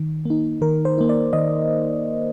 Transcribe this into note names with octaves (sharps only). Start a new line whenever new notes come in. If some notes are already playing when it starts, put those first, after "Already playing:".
Already playing: D#3
A#3 D#4
D#3 A#4
C5
A#3 D#4
D5
D#3 D#5